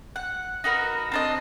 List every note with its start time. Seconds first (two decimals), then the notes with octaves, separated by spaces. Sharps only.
0.16 F#5
0.64 D#4 F#4 A#4 B4
1.12 C4 D4 D#5